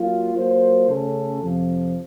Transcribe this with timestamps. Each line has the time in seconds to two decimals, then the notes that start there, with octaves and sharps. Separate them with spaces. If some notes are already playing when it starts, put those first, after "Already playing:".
Already playing: F#3 A#3 F4
0.35 F#3 A#3 F4 C5
0.88 C#3 A3 C#4 A4
1.42 F2 C3 F3